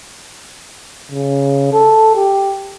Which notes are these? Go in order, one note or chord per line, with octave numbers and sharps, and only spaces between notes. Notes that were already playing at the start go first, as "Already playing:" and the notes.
C#3
A4
G4